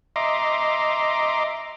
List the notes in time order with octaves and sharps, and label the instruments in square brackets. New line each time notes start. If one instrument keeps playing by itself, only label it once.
[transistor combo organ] D#5 E5 A#5 C6 D6